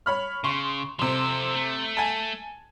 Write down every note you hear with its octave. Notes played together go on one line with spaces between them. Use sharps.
C#5 B5 F6
C#3 C6 C#6
C3 F3 A4 C6
A3
G#5 A5